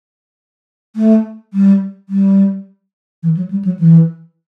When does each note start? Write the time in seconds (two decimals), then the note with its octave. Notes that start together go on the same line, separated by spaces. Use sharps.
0.96 A3
1.54 G3
2.09 G3
3.23 E3
3.37 F#3
3.51 G3
3.65 F#3
3.79 E3